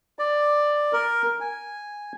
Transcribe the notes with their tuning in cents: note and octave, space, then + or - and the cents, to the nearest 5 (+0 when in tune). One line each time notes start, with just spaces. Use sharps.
D5 +10
A#4 +5
G#5 -5